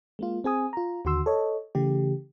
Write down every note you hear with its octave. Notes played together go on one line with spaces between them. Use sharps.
G#3 A#3 F4
C4 G#4 G#5 D#6
F4 A#5
D#2 D3 F#4 C6 E6
A4 C#5 D#5
C#3 E3 A3 G4